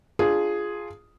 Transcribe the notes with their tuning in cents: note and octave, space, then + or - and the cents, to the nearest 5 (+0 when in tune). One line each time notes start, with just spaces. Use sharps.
D4 +20 F4 +0 G#4 +0